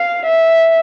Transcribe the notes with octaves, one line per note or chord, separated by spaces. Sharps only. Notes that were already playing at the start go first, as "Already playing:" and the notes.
Already playing: F5
E5